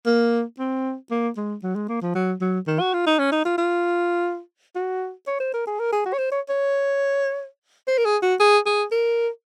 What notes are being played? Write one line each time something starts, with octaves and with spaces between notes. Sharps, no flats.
A#3
C4
A#3
G#3
F#3
G#3
A#3
F3
F#3
F#3
D#3
F#4
F4
D#4
C#4
D#4
F4
F4
F#4
C#5
C5
A#4
G#4
A#4
G#4
F#4
C#5
C5
C#5
C#5
C5
A#4
G#4
F#4
G#4
G#4
A#4